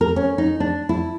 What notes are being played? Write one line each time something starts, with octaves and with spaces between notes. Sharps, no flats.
A#4
C#4
D#4
D4
E4